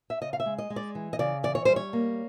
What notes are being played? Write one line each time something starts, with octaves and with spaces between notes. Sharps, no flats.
E5
C#3 D#5
F5
E5
G#3
D#5
G#3
D5
E3
D#5
C#3 D5
E3 D5
C#5
G3 C5
C#5
A#3